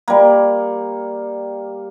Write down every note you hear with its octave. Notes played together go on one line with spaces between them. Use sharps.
G3 A#3